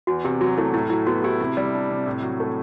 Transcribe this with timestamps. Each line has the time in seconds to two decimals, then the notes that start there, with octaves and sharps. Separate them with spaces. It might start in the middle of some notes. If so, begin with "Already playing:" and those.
0.07 E2 F#4
0.25 C3 G4
0.41 F#3 F#4
0.57 A3 E4
0.73 A2 E4
0.90 F#3 E4
1.07 B3 F#4
1.24 E4 G4
1.40 C3
1.57 G3
1.74 D4
1.90 C3
2.06 A2
2.22 F#3
2.40 A3